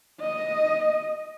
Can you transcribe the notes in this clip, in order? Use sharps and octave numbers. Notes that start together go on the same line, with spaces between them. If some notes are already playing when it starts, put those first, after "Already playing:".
D#5